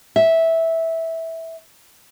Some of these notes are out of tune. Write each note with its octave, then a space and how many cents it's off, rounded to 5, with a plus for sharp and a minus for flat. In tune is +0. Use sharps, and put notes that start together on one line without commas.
E5 -10